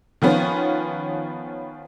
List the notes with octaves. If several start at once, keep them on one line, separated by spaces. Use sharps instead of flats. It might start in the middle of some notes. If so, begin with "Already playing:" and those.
D#3 F3 B3 C#4 F4